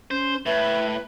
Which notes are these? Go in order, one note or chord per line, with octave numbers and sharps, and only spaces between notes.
C#4 C5
A2 B4 E5